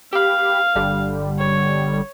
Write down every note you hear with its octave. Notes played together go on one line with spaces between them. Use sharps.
G4 F5 B5
G1 D3 G3
C#5